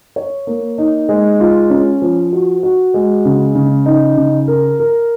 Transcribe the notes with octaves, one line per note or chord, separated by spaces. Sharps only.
C#5
A#3
D#4
G#3
F4
C#4
F3
F#4
F#4
G#3
C#3
C#3
D#4
C#3
A#4
A#4